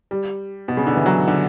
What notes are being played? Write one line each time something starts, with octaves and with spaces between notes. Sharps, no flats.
G3
B2
C#3
D3
E3
F#3
D3